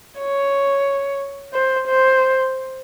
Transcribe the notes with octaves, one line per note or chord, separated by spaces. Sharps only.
C#5
C5
C5